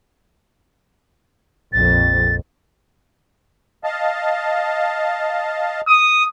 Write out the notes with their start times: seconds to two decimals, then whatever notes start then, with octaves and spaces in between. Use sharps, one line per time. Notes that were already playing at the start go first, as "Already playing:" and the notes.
1.73 A#1 F2 A6
3.84 D#5 F5 A5
5.88 D#6